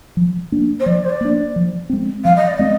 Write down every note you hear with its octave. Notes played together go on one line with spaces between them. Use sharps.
F3
A#3 D4
C5
F3 D5
C5
D5
A#3 D4
F3
G#3 C4
F3 F5
D#5
D5
G#3 C4 D#5